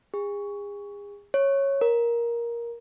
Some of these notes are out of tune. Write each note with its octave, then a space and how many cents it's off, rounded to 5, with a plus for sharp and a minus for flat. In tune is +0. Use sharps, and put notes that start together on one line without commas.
G#4 -35
C#5 -10
A#4 +10